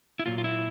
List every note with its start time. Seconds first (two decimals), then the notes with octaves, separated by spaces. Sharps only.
0.19 E4
0.26 A#2 F#3 A#3 F4
0.38 F4
0.44 E4